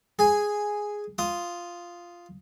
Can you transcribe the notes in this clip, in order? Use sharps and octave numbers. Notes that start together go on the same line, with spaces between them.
G#4 G#5
F4 D#6